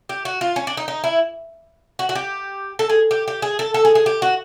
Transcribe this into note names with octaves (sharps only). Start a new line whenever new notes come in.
G4
F#4
F4
C#4
D4
D#4
D#4
E4
F#4
F#4
G4
A4
G#4
G4
G4
G#4
A4
A4
G#4
G#4
G4
F#4